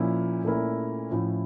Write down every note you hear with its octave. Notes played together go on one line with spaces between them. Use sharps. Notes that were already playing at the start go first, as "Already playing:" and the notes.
Already playing: A#2 F3 C#4 E4
A#2 A3 C#4 E4 A#4
A2 F3 C#4 E4